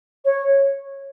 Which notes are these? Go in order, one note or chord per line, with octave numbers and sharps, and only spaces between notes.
C#5